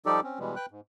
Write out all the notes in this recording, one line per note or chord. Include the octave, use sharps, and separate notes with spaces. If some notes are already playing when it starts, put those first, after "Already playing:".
F3 G3 D#4 G4 A4 D5
C4 C#4
B2 E3 G3 G#3
B4 G5 F#6
G#2